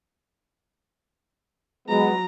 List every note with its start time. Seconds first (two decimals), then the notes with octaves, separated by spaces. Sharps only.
1.89 F#3 G#3 B3 A#5